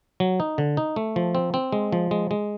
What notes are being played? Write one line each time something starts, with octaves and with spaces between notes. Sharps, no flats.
F#3
D#4
D3
D#4
A3
F3
C4
C4
G#3
F3
G#3
G#3